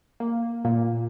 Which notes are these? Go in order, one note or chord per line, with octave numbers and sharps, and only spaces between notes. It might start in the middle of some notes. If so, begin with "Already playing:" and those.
A#3
A#2 A#3